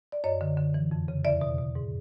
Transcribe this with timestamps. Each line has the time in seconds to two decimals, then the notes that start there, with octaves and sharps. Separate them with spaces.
0.12 D5
0.24 F#2 C#5 D#5
0.41 D3
0.57 D3
0.74 E3
0.91 F2
1.08 C#3
1.25 E2 D5 E5
1.41 B2
1.59 B2
1.75 G#2